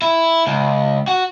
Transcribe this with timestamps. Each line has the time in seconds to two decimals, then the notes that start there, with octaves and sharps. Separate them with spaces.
0.02 E4
0.47 C#2
1.08 F#4